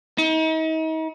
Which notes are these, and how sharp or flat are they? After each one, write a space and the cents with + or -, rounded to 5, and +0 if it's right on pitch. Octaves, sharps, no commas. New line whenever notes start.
D#4 +40